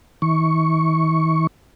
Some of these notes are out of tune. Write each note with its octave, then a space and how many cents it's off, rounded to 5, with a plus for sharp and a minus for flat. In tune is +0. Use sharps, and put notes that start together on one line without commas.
E3 -45 C#6 +0